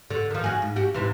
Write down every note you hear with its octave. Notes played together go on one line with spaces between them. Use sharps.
D3
D#3 F3
F#4 G#4
G#2
F#4 G4
G#2 C3 E3